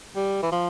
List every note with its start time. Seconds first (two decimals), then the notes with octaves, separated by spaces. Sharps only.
0.16 G3
0.43 E3
0.52 F3